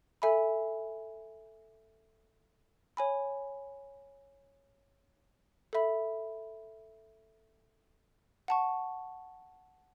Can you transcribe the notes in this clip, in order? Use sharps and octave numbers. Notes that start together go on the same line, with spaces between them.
A4 E5 G#5 B5
C#5 G#5 B5
A4 E5 B5
F#5 A5 C#6